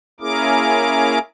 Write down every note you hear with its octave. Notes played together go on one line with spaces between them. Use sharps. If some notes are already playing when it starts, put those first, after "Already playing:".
A#3 C#4 E4 G#4 A#4 D6